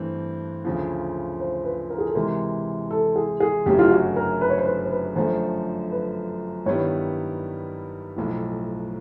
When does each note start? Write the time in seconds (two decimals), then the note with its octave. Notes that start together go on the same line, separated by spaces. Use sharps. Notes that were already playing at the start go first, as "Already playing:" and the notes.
Already playing: G2 E3 A3 C4
0.65 D2 C#3 F3
1.40 C5
1.65 B4
1.90 A#4
1.98 G#4
2.07 A4
2.15 C3 E3 G#3 A#4
2.91 A4
3.16 G#4
3.40 G#4
3.65 G1 F#2 C#3 F#3 A3 G4
3.79 F4
3.91 F#4
4.16 A#4
4.41 B4
4.50 C#5
4.58 C5
4.66 B4
4.85 C5
4.91 B4
5.16 F#2 D3 F3 A3 C5
5.92 B4
6.66 G2 D#3 G3 B3 E4 C#5
8.17 B1 A2 F3